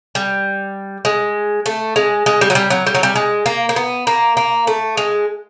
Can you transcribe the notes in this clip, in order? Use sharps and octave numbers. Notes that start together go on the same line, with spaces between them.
G3
G#3
A3
G#3
G#3
G3
F#3
G3
F#3
G3
F#3
G3
G#3
A#3
A#3
B3
A#3
A#3
A3
G#3